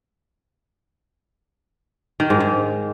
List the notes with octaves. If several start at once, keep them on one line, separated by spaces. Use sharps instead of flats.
D#3
G#2
G#2